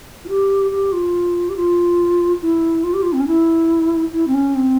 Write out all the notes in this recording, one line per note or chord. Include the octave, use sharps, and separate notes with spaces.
F4
G4
G4
F4
G4
F4
E4
F4
G4
F4
C4
C#4
E4
E4
C4
C#4
C4